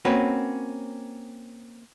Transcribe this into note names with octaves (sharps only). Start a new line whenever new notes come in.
A#3 C4 C#4 F#4 B4